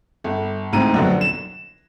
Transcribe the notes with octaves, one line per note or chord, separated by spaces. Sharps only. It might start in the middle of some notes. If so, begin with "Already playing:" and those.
G1
A1 D2 G#2 C4 A#5 D#7
A#1 F#2 B2 D3
E7